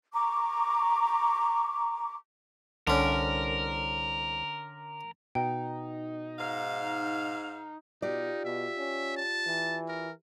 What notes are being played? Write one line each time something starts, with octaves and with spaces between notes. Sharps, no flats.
A#5 C#6 D6
C2 D3 C#4 A#4
B2 D#4 G5
G#2 F5
B2 D#4 F4 G4 D5
B2 E5
C#4
A5
E3
A#4